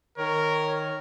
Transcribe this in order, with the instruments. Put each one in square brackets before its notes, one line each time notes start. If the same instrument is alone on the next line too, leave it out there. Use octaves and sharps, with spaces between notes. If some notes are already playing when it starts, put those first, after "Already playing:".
[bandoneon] D#3 [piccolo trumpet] A#4 [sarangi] C#5